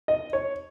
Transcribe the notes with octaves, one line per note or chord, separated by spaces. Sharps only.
D#5
C#5